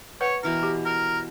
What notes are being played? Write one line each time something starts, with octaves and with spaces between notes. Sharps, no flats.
B4 C#5 F#5
B2 E3 A#4 C#6
G4
A#4